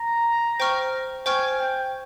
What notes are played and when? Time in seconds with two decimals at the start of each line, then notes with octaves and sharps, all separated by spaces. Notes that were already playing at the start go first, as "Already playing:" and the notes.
Already playing: A#5
0.60 C5 G5 C#6 F6
1.26 C5 G5 G#5 C#6 F6
1.60 G5